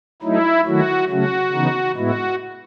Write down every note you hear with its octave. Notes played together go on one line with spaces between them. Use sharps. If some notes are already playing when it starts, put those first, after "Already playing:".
F#3 A3 D#4 E4
D#3 F#3 A3 E4 F#4
C#3 F#3 A3 C#4 F#4
C#3 E3 B3 D#4
A2 G#3 B3 E4 F#4